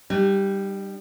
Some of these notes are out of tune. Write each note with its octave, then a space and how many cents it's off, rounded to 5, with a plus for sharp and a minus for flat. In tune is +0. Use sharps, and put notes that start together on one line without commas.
G3 +0 D#4 -45